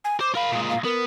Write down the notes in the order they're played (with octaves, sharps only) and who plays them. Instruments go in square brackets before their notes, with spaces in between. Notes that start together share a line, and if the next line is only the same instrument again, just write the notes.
[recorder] G#5
[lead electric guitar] C5 [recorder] D6
[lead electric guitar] A#4 B5 [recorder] F5
[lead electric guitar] A#2 G#3
[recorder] F5
[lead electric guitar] B3 [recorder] A#4